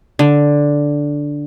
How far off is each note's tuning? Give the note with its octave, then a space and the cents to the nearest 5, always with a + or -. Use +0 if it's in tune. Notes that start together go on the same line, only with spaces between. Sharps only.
D3 -5